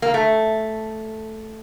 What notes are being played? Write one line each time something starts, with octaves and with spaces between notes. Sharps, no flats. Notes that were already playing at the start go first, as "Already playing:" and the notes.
A#3
A3